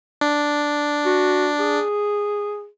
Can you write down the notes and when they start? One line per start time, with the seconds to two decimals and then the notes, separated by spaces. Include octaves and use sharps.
0.21 D4
1.06 F#4
1.60 G#4